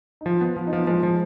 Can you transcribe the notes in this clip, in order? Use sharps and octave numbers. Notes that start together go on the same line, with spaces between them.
D#4
F3 F4
B3
F3 F4
D#4
F3 B3
F3 G#3
F3